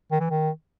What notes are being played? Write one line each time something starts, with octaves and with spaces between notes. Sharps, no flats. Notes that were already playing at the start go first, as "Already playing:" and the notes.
D#3
E3
D#3